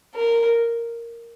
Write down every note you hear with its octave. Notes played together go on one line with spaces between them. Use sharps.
A#4